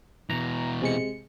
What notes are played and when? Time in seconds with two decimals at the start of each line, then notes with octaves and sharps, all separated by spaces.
0.30 B2 E3 A#5
0.81 C3 G#3 C#7